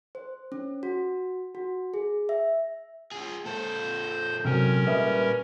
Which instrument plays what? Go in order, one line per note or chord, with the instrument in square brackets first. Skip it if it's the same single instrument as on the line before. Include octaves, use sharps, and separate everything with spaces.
[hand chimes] C5
C#4
F#4
F#4
G#4
E5
[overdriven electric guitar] F4 G#4
[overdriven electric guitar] A#2 A4 [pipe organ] C5 G6
[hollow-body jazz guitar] C3 F#3 [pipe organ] C#4 A#4
[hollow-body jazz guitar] G3 D#5 E5 [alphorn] B4